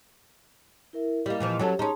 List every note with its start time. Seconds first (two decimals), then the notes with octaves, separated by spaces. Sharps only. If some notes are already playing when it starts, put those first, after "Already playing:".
0.93 E4 A#4 E5
1.26 G3 A#3 E4 D#5
1.40 A#2 E3 F3
1.59 F#3 C#4 G4 A4 C#5
1.79 C#4 D#4 G#4 A5 C6